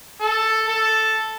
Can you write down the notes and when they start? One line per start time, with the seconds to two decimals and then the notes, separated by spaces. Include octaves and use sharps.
0.21 A4
0.68 A4